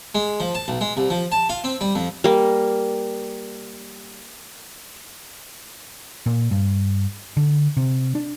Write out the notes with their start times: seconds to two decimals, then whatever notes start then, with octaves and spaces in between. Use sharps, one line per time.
0.15 G#3
0.40 F3
0.55 A5
0.68 B1
0.81 G#3
0.97 C2
1.10 F3
1.32 A5
1.49 F4
1.64 C4
1.81 G3
1.95 F2
2.24 G3 A#3
6.26 A#2
6.51 G2
7.37 D3
7.77 C3
8.15 D4